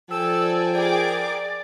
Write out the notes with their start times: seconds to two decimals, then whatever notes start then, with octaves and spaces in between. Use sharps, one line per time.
0.11 F3 A4 D5 G5 G#5 E6
0.74 G#4 A#4 D5 D6